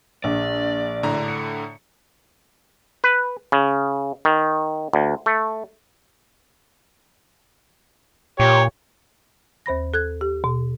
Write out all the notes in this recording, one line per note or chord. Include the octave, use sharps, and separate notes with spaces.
A#1 D5
A2 D3 A#5
C#7
B4
C#3
D#3
D2
A3
A#2 G4 C#5
D#2 C5 B5 A#6
A4 F#6 G#6
G4
B2